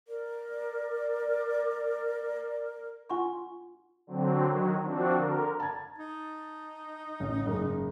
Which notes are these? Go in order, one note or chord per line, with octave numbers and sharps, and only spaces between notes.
A#4 D5
F4 F#5 G#5 C6 C#6
D3 F#3 C4
D#3 F#3
F3 C4 D4 F#4
D3 A#4
A5 G#6
D#4
A1 C#4
F#1 G#2